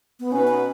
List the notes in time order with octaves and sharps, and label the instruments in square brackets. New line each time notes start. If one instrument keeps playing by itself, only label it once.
[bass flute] B3
[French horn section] B2 B3 D#4 B4 [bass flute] C#4
[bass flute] C#4